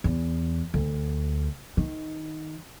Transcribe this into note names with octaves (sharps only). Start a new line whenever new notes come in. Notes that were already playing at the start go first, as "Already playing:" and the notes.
E2
D2
D#3